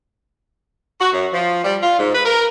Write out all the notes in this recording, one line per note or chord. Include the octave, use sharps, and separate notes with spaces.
F#4
F#2
F3
G3
F4
G#2
B4
A#4